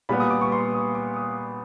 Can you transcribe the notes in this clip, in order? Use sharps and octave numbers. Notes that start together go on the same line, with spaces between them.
A#2 G3 B3 B5
D#6
D6
C#6
C6
D#6
D6
D#6